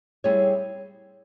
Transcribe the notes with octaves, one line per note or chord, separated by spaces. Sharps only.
G3 C4 E4 G#4 C#5